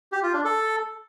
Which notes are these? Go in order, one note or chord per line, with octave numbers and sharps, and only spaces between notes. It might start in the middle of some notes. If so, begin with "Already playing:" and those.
G4
F4
D4
A4